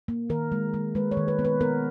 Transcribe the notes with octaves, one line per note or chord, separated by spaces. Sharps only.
A#3
D#3 A#4
G#3
G#3
G#3 B4
C#5
D#3
B4
B3
B4
B3 A#4